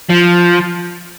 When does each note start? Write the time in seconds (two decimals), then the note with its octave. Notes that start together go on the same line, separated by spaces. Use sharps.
0.09 F3